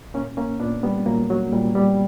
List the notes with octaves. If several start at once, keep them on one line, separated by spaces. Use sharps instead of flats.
A#2 A#3 C#4
A#3 C#4
A#2 B3 D4
G3 B3
A#2 F#3 A#3
F#3
A#2 G3
G3 B3